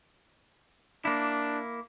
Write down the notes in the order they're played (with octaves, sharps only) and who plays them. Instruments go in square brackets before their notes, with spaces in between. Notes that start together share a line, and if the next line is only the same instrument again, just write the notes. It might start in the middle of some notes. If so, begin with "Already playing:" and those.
[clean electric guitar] A#3 E4 [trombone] D4